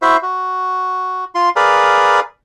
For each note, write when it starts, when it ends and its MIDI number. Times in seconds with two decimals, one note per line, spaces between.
0.02 0.17 64
0.02 0.17 66
0.02 0.17 72
0.02 0.17 76
0.23 1.25 66
1.35 1.49 65
1.35 1.49 84
1.56 2.20 68
1.56 2.20 70
1.56 2.20 71
1.56 2.20 74
1.56 2.20 77